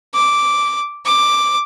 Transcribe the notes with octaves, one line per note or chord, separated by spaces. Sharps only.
D6
D6